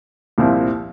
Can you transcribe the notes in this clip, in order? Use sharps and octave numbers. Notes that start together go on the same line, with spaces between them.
C2 A#2 F3 C4 E4